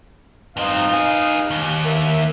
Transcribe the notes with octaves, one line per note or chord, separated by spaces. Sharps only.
G2 C4 D#4 B4 F5
F4 G#4
D#2
A#4 E5